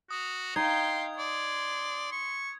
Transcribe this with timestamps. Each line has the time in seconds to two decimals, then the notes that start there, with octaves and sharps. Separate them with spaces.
0.11 F#4 D#6
0.56 D#4 F5 G5 C6 G#6
1.18 D5 C6
2.12 C#6